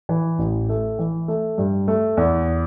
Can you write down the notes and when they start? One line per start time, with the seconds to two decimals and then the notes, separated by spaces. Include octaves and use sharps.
0.09 E3
0.39 A1
0.69 A3
0.99 E3
1.28 A3
1.58 G2
1.88 A3
2.17 E2